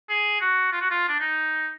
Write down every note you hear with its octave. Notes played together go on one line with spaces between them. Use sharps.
G#4
F#4
F4
F#4
F4
D4
D#4